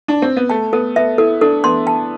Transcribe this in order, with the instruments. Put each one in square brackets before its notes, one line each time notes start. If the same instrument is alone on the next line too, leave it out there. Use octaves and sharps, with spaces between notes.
[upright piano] D4
C4
B3
[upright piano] A3 [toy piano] A5
[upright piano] B3 [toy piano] A4
[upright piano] B3 [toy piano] E5
[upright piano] E4 [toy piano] A4
[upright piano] D4 [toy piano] A4
[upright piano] B3 [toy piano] C6
[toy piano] A5